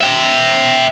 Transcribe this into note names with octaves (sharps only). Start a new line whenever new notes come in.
E5 G5